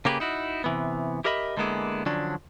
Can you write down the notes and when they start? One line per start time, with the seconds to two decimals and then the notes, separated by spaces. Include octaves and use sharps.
0.05 C#3 A#3 G4 G#4 A#4 B4
0.20 D#4 E4 F#4
0.64 C3 E3 B3
1.24 E4 G4 A#4 D#5 E5 B5
1.57 D3 G#3 A#3 B3 E4 G#4
2.06 D3 F3 F#3 C#4 D4